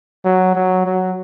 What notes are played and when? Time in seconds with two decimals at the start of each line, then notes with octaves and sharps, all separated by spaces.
0.25 F#3
0.55 F#3
0.85 F#3